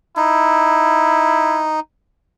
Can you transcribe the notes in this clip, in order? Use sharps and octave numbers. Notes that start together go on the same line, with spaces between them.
D#4 E4